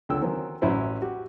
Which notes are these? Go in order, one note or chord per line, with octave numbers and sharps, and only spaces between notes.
C#2 D3 G5 E6
D#3 E3 F#3 C4
A1 F#3 C#4 E4 C5 B5
F#4 G4